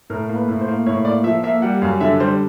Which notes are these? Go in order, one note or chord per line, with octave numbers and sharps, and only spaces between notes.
A2 A#4
A#3
B4
A2
C5
A#3
A2 C#5
A#3 D5
F3 E5
A#3 E5
G3 F#5
F#2 F5
D3 E5
G3 C5